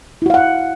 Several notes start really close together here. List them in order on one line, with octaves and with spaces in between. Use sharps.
E4 F#4 F5 F#5